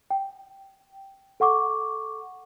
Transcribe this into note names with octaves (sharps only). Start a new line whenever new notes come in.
G5
A4 F#5 C#6 D6